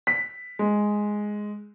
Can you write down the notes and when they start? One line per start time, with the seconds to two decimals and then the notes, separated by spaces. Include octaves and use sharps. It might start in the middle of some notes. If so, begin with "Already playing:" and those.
0.07 B6
0.59 G#3